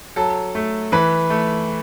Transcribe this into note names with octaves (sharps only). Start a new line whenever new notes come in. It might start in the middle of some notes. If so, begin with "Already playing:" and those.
F#3 A4
A3
E3 B4
A3